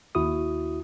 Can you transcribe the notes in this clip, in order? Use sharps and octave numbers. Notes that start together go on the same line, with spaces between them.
D#2 E4 F#4 D#6